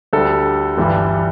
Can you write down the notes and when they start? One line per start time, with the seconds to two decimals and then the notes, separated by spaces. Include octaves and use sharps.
0.13 D2 D3 G3 A4
0.77 G1 G2 E3 G3